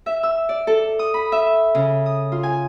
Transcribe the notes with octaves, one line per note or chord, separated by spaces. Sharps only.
E5
E6
D5
A4
D#6
B5
E5
C#3
D#6
F4
G#5